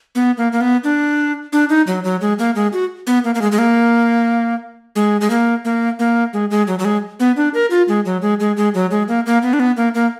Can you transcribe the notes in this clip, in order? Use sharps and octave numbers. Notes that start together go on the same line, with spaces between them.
B3
A#3
A#3
B3
D4
D4
D#4
F#3
F#3
G#3
A#3
G#3
F#4
B3
A#3
A#3
G#3
G#3
A#3
G#3
G#3
A#3
A#3
A#3
G#3
G#3
F#3
F#3
G#3
B3
D4
A#4
F4
G#3
F#3
G#3
G#3
G#3
F#3
G#3
A#3
A#3
B3
D4
B3
A#3
A#3